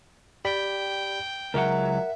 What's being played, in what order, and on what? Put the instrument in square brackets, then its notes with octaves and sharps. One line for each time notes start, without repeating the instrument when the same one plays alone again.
[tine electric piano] G4 D5 B5 [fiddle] G5
[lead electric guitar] C#2 F#3 [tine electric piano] A#4 F#5 [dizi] E5